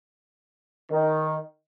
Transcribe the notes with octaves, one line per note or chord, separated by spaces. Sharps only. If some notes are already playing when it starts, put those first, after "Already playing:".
D#3